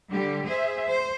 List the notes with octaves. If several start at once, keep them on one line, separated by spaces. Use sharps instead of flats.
D3 G3 G4
G#4 C5 E5
C5